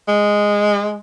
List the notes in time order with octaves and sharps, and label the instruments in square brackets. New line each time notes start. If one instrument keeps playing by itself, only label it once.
[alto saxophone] G#3